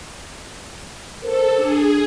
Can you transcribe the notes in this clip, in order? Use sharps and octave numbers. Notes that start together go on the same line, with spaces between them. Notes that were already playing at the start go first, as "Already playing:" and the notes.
A4 A#4 C5
D4 G#4